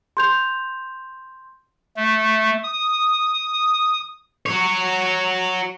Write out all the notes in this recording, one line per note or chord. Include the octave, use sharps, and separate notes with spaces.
C6 G6 F7
A3
D#6
F#4 C#5